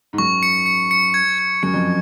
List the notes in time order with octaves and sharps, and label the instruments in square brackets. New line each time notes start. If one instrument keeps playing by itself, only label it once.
[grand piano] G#2
[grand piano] F#2 [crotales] C#6
[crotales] C#7
C#7
C#7
G#6
G#6
[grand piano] F#2 [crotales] C#7
[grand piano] F2